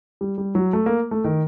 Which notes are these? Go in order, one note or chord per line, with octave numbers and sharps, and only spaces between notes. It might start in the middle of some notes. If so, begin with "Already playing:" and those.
G3
G3
F#3
A3
A#3
A3
D#3